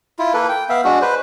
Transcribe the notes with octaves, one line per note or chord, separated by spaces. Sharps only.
E4 F4
A#3 A4 B4
G5
B3 E5 F5
G#3 D4 F#4
B4 C5